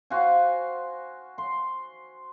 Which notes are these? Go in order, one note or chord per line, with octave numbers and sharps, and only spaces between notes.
F#4 C5 F5 G#5
C6